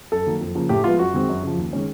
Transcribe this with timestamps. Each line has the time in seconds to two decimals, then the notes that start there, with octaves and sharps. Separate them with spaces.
0.12 F#2 A4
0.27 D#3 F#3 A#3
0.41 F2
0.55 C#3 F3 A#3
0.69 A2 G4
0.84 F3 G#3 B3 F4
0.99 F#2 F#4
1.14 D#3 G#3 C4
1.29 F#2
1.43 C#3 F3
1.58 D#2
1.73 D#3 G#3 C#4